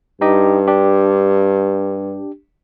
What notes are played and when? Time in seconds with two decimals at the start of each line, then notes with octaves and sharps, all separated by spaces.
0.21 G2 D#4 G4 D#5
0.67 D4 G4